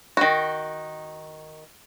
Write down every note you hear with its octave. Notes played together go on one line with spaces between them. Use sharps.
D#3 F#4